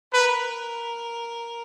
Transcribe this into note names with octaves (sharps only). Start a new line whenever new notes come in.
A#4 B4